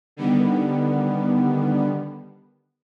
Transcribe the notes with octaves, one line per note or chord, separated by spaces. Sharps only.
D3 D#3 G3 B3